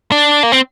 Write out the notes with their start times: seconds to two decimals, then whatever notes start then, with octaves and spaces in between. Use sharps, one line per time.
0.12 D4
0.43 A#3
0.52 C4